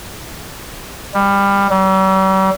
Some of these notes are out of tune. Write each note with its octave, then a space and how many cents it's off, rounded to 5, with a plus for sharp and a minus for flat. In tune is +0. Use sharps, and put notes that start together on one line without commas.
G3 +20
G3 -45